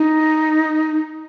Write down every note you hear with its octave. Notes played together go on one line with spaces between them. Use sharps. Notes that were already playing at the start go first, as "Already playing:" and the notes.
Already playing: D#4